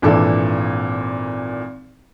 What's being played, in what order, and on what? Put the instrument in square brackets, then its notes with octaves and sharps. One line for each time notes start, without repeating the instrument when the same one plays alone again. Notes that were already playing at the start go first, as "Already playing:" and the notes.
[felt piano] G#1 A#2 E3 D4 A4